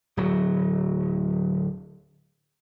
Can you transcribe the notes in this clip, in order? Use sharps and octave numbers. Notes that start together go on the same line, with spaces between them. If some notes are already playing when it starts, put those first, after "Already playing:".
D1 F#3